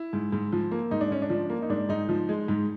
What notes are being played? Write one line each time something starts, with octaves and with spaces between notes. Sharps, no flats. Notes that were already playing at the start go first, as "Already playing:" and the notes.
Already playing: E4
G#2
G#2
F3
A#3
G#2 D#4
D4
G#2 C#4
D4
F3
A#3
D#4
G#2 D4
G#2 D#4
F3
G#3
G#2